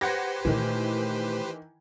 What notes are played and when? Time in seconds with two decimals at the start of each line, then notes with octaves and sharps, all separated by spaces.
0.01 G4 B4 C5 F#5 G#6 A#6
0.45 A#2 D#3 E3 A3